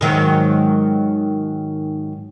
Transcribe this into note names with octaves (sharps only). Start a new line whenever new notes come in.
G#2 D#3 F#3